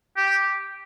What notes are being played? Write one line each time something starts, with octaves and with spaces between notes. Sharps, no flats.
G4